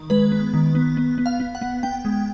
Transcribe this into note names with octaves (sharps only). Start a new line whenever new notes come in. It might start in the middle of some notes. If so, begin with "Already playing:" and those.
Already playing: D#3
G#3 B4
B3
D#3
B3
B3
B3
F5
B3
F#5
B3
B3 G5
G#3